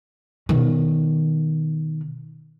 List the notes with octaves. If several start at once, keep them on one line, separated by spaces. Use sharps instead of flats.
B2 D#3